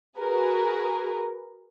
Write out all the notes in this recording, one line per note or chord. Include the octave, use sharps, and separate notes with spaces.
F#4 G#4 A#4 B4